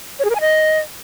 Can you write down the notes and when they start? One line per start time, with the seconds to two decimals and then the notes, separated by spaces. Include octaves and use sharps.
0.19 C#5
0.25 G#4
0.30 A#4
0.35 G#5
0.41 D#5